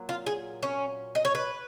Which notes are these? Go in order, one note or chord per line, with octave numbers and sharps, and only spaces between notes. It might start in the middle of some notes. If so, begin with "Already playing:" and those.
Already playing: A#2 F#3
F4
G#4
C#4
D#5
C#5
B4